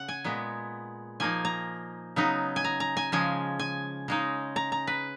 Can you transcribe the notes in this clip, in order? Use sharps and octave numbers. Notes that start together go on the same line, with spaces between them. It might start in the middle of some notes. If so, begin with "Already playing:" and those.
Already playing: C#3 F#5
G#5
A#2 G#3 B3
F3 A#3 D#4 G#5
A#5
C#3 F#3 B3 D#4
G#5
A#5
A#5
G#5
C#3 F3 G#3 G#5
G#5
C#3 G#3 D#4
A#5
A#5
B4